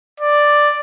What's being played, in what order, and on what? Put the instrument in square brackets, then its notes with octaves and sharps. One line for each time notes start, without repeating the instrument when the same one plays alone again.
[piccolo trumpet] D5